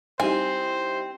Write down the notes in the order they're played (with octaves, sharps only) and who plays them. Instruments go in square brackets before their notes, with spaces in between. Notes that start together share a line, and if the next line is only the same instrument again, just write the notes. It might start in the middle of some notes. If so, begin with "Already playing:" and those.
[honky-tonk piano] G3 D#4 E4 [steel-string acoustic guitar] C4 [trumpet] C5 [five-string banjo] G#5